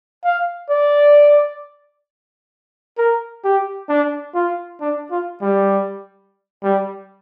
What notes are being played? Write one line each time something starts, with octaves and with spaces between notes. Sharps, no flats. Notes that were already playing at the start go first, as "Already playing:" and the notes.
F5
D5
A#4
G4
D4
F4
D4
F4
G3
G3